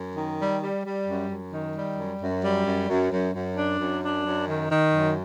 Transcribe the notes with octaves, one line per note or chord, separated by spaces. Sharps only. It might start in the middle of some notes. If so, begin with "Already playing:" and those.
Already playing: F#2
D#3
G3
G3
G3
F#2
F#2
D#3
G3
F#2
F#2
G3
F#2
F#2
F#2
F#2
D4
F#2
D4
F#2
D#3
D#3
F#2